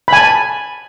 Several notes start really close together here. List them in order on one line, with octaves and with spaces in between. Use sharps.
B5 G#5 A5